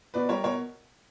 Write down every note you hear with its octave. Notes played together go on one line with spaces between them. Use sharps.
B2 B4 D5
G3 A#4 C#5
B2 A#4 C#5